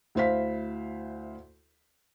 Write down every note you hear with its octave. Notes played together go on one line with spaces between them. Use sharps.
D2 E4 C5 F5 B6